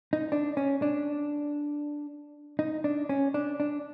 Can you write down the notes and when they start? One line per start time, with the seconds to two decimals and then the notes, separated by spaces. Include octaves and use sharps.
0.13 D#4
0.32 D4
0.57 C#4
0.82 D4
2.59 D#4
2.84 D4
3.09 C#4
3.34 D4
3.60 D4